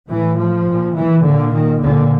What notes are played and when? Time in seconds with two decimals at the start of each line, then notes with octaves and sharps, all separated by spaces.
0.11 A2 E3
0.39 F3
0.67 A#2
0.96 E3
1.24 A#2 D3
1.53 D#3
1.82 A#2 D3